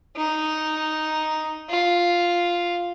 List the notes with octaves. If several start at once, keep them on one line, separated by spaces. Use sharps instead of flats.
D#4
F4